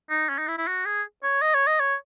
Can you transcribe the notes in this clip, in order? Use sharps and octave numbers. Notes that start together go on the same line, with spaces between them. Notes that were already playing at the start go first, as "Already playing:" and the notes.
D#4
C#4
D#4
E4
E4
F#4
G#4
C#5
D#5
C#5
D#5
C#5